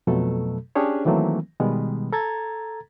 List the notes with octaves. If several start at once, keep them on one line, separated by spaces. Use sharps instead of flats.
F2 B2 F#3 A3 A4
C#4 D4 G4 G#4 C#5
D#3 E3 F#3 A3 A#3 C4
B2 D#3 G3 G#3 B3
A4 A#5 G#6 A6